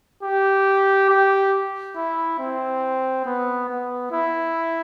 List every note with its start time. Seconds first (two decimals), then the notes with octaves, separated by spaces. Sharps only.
0.23 G4
1.09 G4
1.96 E4
2.39 C4
3.26 B3
3.69 B3
4.12 E4